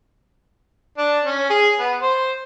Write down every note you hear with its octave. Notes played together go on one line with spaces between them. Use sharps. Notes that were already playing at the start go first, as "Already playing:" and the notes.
D4
C#4
G#4
B3
C5